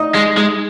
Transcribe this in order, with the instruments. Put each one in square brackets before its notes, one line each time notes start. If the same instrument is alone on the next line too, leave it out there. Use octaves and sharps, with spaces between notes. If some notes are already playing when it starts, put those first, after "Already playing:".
Already playing: [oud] D#4
[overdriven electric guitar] G#3
G#3